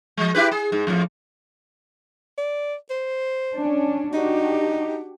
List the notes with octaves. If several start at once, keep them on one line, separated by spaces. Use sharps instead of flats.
F3 G#3
E4 G4 B4
G#4
G#2
F2 A2 F3
D5
C5
C#4 D4
D4 D#4 F#4 G4